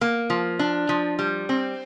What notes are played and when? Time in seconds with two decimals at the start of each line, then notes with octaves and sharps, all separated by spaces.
0.01 A#3
0.30 F3
0.59 D4
0.89 F3
1.19 G3
1.49 C4